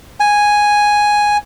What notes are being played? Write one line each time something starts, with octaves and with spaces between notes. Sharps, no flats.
G#5